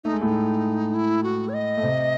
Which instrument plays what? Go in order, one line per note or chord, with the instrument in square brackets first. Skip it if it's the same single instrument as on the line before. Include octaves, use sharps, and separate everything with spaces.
[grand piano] A3 [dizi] D#4
[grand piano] G#3
[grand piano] A2 A3 [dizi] D#4
[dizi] E4
F#4
C#5
D#5
[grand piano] A3
C3 C4